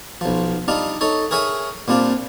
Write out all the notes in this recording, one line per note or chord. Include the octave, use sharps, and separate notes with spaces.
B1 F3
G3 D4 D#4 F4
D#4 A4 C#5
G#4 A#4 C#5 E5 G#5
A#2 G3 C4 D4 F4